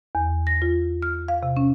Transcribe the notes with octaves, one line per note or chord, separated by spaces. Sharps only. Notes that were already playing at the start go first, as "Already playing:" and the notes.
E2
A#6
F4
F6
F5
C3
C#4